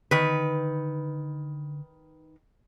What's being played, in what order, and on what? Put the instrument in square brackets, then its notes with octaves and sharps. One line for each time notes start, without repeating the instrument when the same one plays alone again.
[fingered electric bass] D3 [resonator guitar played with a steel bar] D#3 B4